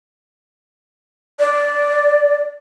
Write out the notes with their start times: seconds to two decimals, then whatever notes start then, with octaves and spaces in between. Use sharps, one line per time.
1.39 D5